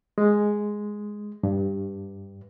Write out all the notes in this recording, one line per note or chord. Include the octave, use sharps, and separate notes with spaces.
G#3
G2